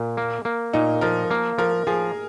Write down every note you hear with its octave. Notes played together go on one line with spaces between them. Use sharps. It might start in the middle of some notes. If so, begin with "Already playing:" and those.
Already playing: A#2
A#3
A#3
A#2 D#4
F3 A#4
A#3
F3 A#4
F3 G#4